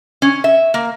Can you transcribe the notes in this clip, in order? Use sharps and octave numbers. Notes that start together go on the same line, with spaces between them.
C#4
E5
A#3